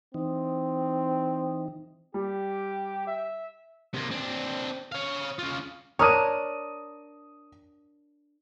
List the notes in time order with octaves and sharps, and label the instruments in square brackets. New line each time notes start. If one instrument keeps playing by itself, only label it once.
[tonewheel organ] E3 D#4 [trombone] C4
[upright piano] G3 [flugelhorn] G4
[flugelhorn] E5
[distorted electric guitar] C3 A#3
C4 D4
C#5 F5
C#4 F4
[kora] D4 A#4 C#5 [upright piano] D#6 D#7